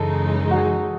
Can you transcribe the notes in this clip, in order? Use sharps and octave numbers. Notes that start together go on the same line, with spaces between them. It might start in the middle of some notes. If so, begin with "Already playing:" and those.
Already playing: F#2 C#3 E3 G#3 D#4 A4
F#4
G#4